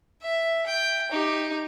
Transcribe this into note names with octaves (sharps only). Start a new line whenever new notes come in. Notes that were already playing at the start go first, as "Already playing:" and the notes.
E5
G5
D#4 G4